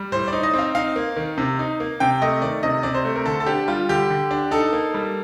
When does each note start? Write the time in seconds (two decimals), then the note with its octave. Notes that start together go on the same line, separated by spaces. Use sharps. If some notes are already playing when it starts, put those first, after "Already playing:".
Already playing: G3
0.12 A2 C5
0.28 D#4 D5
0.43 D#5
0.54 C4
0.59 F5
0.75 D#4 F5
0.96 A#3
1.16 D#3
1.38 C3
1.59 D#4
1.80 A#3
2.00 C3 G5
2.22 A3 D#5
2.42 D#3 D5
2.63 C3 D#5
2.83 C3 D5
2.95 C5
3.05 A3
3.16 A#4
3.26 D3 A4
3.40 A4
3.46 D4 G4
3.68 G3 F4
3.89 D3 G4
4.10 D3
4.31 D4
4.51 D#4 A4
4.73 A#3
4.94 G3